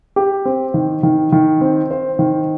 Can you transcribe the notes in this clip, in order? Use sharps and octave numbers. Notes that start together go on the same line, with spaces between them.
G4
C4
D#3
D#3
D#3
C4
C5
D#3